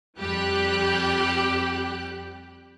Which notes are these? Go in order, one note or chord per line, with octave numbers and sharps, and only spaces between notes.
F2 G3 G4 F#6